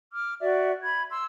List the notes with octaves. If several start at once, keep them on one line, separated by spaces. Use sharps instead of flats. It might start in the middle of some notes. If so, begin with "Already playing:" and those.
D6 F6
F#4 D5 E5
B5 G#6
C6 E6